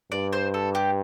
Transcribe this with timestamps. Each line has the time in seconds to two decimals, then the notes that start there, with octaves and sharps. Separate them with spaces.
0.12 G2 D5
0.33 C5
0.54 A4
0.75 G4